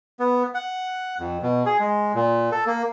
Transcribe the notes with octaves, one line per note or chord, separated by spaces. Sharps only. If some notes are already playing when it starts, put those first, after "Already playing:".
B3
F#5
F2
B2
G#4
G#3
A#2
A4
A#3